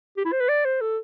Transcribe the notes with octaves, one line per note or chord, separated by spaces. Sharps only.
G4
E4
C5
B4
D5
C5
A4